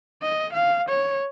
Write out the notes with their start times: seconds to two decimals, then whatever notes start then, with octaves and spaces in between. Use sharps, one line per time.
0.22 D#5
0.53 F5
0.89 C#5